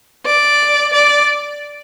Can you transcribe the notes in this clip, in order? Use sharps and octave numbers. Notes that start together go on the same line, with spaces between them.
D5
D5